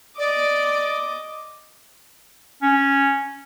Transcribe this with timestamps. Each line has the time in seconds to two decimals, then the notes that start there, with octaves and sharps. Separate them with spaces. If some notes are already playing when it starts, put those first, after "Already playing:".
0.18 D5 D#5 D6
2.62 C#4